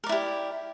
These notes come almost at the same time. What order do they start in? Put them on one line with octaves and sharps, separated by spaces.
A#4 D5 E4 G4